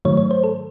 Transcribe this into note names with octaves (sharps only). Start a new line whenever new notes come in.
G#2 D#3 F#3 A3 C#5
C#5
C5
A4